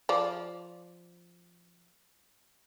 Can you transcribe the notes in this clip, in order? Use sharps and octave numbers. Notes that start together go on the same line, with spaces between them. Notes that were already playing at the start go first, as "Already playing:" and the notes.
F3 D5